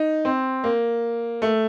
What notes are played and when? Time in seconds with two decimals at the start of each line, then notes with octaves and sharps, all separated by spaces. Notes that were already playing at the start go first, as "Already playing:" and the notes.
Already playing: D#4
0.25 C4
0.64 A#3
1.42 A3